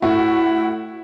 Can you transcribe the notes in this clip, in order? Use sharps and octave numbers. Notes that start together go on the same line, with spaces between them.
A2 A3 E4 F#4